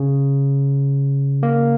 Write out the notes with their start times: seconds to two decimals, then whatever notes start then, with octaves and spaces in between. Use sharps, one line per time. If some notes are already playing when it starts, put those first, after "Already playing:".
Already playing: C#3
1.43 A#3